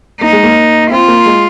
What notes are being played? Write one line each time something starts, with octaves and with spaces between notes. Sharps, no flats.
A#3 D#4
G#3
A#3
C4 F4
A#3
G#3